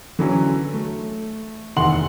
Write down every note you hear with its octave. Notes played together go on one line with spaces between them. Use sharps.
D3 E3 F#3 C#4
A3
F1 D#2 E3 F#5 C6 F#7